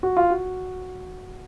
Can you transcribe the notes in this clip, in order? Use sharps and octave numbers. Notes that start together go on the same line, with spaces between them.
F#4
F4
F#4